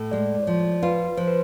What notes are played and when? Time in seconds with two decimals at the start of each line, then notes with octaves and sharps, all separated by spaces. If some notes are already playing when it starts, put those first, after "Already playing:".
Already playing: A2
0.11 G#3 D5
0.35 D5
0.43 C#5
0.47 F3 D5
0.82 F4 B4
1.17 F3 C5
1.28 B4